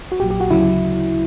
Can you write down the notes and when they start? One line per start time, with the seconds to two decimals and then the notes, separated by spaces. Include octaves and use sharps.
0.12 F#4
0.20 A#1 A#2 F#3 G4
0.30 G4
0.40 F#4
0.50 D2 C#3 F#3 E4